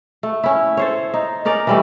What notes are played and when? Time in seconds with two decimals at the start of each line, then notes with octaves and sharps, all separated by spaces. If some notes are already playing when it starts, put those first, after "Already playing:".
0.23 A3
0.44 C#4 E4
0.77 A4 C5 C#5
1.14 D#4
1.45 C#4 D#4 A#4 D5
1.67 E3 G3 A3